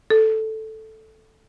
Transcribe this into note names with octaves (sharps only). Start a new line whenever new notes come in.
A4